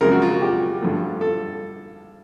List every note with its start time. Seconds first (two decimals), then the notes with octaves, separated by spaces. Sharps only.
0.01 F#2 C#3 F3 G#3 C4 A#4
0.12 F#4
0.22 F4
0.31 F#4
0.42 G4
0.81 G2 D3 F3 A3
1.21 A4